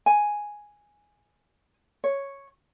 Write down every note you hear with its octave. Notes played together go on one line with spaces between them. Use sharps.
G#5
C#5